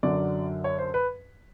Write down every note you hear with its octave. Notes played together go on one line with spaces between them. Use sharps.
F#2 D3 F#3 D5
C#5
C5
B4